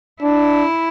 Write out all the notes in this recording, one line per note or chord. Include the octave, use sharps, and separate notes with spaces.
D4 E4